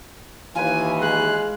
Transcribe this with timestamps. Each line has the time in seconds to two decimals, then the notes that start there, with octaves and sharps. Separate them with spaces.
0.55 D#2 E3 F4 B4 G#5
1.01 G#3 F#6